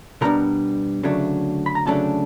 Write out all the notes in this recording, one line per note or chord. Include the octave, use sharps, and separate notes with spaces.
B2 G3 B3 D4 A#4 A#5
D2 C#3 F#3 A3 D4
B5
A#5
D2 C#3 F#3 A3 D4 A4 A5